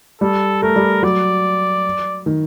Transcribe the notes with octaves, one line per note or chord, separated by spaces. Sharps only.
G3 A4
A3 A#4
G3
F#3 D5
D#3